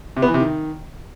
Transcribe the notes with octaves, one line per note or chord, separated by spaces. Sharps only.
C3
B3
E3
C3
D#3